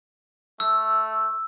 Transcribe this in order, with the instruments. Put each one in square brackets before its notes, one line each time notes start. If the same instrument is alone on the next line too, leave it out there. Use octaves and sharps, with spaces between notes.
[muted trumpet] A3 [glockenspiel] E6